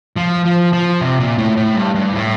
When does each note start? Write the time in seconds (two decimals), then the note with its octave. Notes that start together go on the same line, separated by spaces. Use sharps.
0.16 F3
0.45 F3
0.73 F3
1.01 C3
1.20 A#2
1.38 A2
1.57 A2
1.76 G2
1.95 G2
2.14 A2